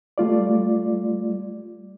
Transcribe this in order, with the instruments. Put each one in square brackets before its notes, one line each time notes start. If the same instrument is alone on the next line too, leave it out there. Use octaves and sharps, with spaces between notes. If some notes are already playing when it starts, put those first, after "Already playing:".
[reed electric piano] G3 A3 F4 D5